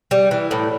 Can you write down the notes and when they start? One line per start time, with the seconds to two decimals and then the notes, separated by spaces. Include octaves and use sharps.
0.11 G3
0.31 E3
0.51 A2